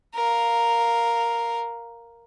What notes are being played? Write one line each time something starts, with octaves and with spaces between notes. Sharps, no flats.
A#4 F5